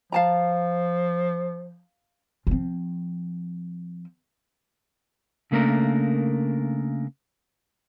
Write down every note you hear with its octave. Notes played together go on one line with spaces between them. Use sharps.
F3 F5 A5 A#5
F3 C4
C#3 A3 A#3 D4 A#4